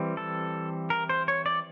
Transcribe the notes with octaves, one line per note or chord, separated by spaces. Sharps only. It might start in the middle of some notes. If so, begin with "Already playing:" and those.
Already playing: E3 G3 C4
A4
A#4
C5
C#5
D5